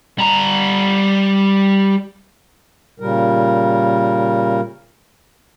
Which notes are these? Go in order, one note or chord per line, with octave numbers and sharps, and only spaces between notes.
G3 A#5
A#2 C#3 G3 A#4